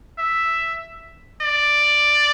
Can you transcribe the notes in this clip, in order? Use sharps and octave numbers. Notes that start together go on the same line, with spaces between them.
E5
D5